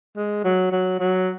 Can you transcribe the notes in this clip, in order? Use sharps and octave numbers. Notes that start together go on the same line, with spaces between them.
G#3
F#3
F#3
F#3